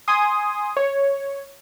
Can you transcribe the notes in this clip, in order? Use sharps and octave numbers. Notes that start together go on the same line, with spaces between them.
G#5 C6 D#6
C#5